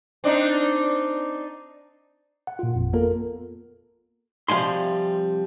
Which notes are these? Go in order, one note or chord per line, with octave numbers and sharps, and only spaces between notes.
C4 D4 D#4
F#5
A#2 F4
G#1 F2
A#3 B3 F4 A4 A#4
C3 F3 G3 G#5 C6